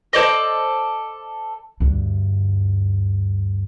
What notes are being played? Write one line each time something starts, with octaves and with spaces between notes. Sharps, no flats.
A4 C5 D5 D#5
D2 G2